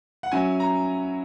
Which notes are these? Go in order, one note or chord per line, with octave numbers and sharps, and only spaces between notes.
F#5
F#3 C#4 E4 G#5
A#5